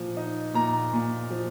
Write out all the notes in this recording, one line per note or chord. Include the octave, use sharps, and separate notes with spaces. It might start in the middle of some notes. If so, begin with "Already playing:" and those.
Already playing: A#2 F3
D#4
A#2 A#5
A#2
F3